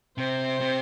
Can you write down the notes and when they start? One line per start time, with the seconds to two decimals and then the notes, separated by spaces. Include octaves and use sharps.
0.18 C3 C5
0.60 C3